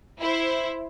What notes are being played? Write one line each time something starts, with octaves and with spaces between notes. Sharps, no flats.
E4 C5